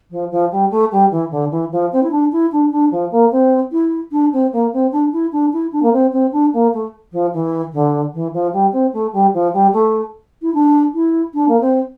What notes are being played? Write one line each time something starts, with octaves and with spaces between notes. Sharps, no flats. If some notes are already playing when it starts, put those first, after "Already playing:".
F3
F3
G3
A3
G3
E3
D3
E3
F3
C4
E4
D4
E4
D4
D4
F3
A#3
C4
E4
D4
C4
A#3
C4
D4
E4
D4
E4
D4
A#3
C4
C4
D4
A#3
A3
F3
E3
D3
E3
F3
G3
C4
A3
G3
F3
G3
A3
E4
D4
E4
D4
A#3
C4